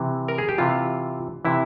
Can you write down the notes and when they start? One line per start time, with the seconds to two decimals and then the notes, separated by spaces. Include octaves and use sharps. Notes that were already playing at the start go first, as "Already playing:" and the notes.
Already playing: C3 E3
0.28 A#4
0.38 G#4
0.49 G4
0.58 C3 E3 F4
1.45 C3 E3 E4